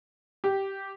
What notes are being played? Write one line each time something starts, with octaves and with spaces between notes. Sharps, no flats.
G4